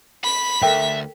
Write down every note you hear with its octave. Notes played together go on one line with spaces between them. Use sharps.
B5 B6
D2 A4 A#4 E5 G5